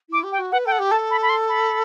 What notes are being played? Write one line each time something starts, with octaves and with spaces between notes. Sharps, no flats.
E4 D6
G4
G5
F#4
B4 F#5
A4 G5
F#5
G4
A4 A5
B5
B5
C6
B5